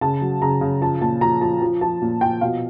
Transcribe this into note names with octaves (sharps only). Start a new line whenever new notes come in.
C#3 A5
F#3
C#3 A#5
C#3
F3 A5
A#2 A5
F3 A#5
F3 A5
F3
F3 A5
A#2
F3 G5
B2 F5